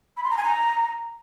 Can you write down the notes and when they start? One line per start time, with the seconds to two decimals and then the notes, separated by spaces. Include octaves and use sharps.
0.17 B5
0.23 C6
0.30 A#5
0.37 G#5
0.44 A#5